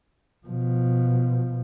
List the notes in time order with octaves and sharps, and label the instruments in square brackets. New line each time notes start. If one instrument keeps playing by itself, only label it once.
[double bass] B2 F3